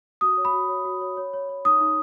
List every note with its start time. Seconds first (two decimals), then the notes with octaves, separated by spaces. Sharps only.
0.21 F#4 D#6
0.37 C#5
0.45 B5
0.53 F#4
0.69 C#5
0.85 F#4
1.01 C#5
1.17 C#5
1.33 C#5
1.49 C#5
1.65 D#4 D#6
1.81 D#4